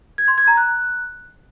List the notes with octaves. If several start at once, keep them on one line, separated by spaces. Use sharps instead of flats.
G#6
C6
G#6
A#5
F#6